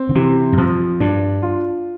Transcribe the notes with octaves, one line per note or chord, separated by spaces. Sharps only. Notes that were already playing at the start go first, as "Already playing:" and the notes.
Already playing: C4
D3
C3 E3
G2
F2 F3
G2 D4
F4